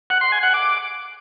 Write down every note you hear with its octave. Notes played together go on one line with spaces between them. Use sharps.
F#5
C6
G#5
F#5
D6